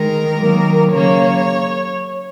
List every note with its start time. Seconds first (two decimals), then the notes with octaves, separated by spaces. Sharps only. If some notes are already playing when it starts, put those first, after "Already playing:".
Already playing: D#3 G#3 A#4
0.39 D#3 F#3 A#3
0.92 C#3 F#3 A#3 C#5